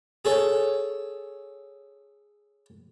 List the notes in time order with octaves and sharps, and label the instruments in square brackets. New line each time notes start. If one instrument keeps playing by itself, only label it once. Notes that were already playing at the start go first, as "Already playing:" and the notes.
[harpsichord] G#4 A4 C#5